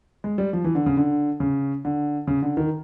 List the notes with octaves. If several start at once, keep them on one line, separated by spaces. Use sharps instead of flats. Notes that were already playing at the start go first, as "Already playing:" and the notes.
G#3
G3
F3
E3
D3
C#3
D3
C#3
D3
C#3
D3
D#3